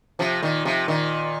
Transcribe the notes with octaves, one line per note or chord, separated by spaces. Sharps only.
C3 F3
A#2 D#3
C3 F3
A#2 D#3